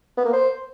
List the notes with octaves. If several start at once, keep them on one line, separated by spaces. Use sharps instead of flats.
B3
A#3
C5